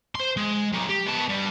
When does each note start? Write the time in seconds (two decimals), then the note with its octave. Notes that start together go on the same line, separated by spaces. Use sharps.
0.15 C5 C6
0.37 G#3
0.73 F#3 D#4
0.89 G4
1.06 B3 A5
1.28 G2 G3